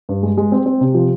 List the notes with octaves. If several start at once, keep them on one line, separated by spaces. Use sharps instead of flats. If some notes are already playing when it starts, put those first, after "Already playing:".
G2
G#3
G#3
C4
C4
C3
F3